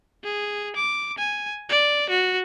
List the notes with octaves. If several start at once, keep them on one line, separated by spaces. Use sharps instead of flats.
G#4
D6
G#5
D5
F#4